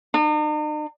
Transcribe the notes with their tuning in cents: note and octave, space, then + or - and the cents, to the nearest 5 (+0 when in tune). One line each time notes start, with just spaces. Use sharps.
D#4 -45